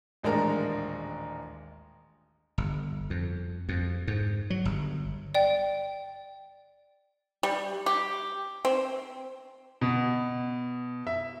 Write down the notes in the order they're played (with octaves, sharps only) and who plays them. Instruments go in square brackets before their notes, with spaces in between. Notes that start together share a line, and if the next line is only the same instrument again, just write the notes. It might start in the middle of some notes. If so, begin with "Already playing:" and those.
[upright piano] D#1 A1 G#3 D4 A#4 A#5
[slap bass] G1
F2
F2
G#2
F#3
G1
[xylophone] D5 G5
[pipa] G3
G4
C4
[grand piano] B2
E5